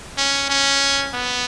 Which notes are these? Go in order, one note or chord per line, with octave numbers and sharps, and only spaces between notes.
C#4
C#4
B3